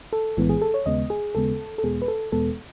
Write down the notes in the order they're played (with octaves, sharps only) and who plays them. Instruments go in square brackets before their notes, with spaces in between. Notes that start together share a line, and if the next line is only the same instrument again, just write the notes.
[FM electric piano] A4
B1 A2 E3 G#3 B3
G#4
A4
C#5
D#2 C#3 G#3 B3 D#5
G#4
D#2 C#3 G#3 B3 A4
A4
E2 B2 G#3 B3 G#4
B4
A4
E2 B2 G#3 B3 A4